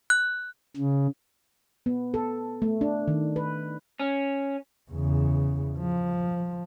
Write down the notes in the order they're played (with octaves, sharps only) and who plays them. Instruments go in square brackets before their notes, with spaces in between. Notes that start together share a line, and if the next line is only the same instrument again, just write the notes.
[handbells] F#6
[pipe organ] C#3
[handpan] B3
A4
A3
D4
D#3
B4
[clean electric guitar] C#4
[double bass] E2 C#3
F3